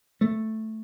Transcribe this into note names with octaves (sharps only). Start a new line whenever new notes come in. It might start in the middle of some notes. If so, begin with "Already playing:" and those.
A3